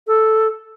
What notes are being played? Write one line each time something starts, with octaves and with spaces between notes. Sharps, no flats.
A4